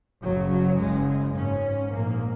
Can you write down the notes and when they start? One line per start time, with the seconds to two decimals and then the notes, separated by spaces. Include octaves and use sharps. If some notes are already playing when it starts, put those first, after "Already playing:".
0.23 F#1 F#2 C#3 F#3
0.51 F#3
0.79 F#1 F#2 C#3 G#3
1.35 G#1 G#2 C#4
1.92 A#1 G#2 A#3